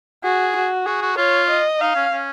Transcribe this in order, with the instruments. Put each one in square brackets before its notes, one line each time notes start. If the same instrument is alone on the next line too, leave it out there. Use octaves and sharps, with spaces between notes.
[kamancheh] F#4 [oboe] G#4
[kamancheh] F#4
[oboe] F#4 [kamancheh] G#4
[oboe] F#4
[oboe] F4 [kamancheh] C#5
[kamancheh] D#5
[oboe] D#4 [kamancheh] F5
[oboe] C#4
C#4